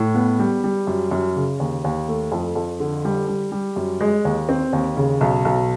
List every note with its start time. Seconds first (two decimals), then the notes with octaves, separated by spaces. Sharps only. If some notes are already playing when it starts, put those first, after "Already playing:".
Already playing: A2
0.14 B3
0.39 G3
0.64 G3
0.87 F#2
1.11 F#2
1.36 C#3
1.60 D#2
1.84 D#2
2.08 A3
2.32 F2
2.56 F2
2.80 D3
3.05 G3
3.28 G3
3.52 G3
3.76 F#2
4.01 G#3
4.25 D#2
4.49 C4
4.73 D#2
4.97 C#3
5.21 B1
5.45 B1